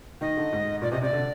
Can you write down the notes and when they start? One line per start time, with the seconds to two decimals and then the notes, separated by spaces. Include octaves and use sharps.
0.21 D#3 D#5
0.37 D3
0.52 G#2
0.82 A#2 D5
0.92 C3 D#5
1.02 C3 D5
1.13 D3